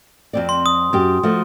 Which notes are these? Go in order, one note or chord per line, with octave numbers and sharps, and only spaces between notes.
F2 C4 D5
C6
D#6
F#2 G4
F3 A3 F#4